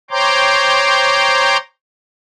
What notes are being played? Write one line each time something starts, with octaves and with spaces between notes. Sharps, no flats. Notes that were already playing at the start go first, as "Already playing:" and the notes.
C5 C#5 G5 A#5 C6 D6